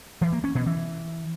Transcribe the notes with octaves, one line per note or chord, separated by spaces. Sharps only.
E3
A#3
C#4
B2
E3